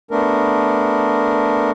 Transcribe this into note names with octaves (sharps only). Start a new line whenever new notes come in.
A3 B3 D4 A#4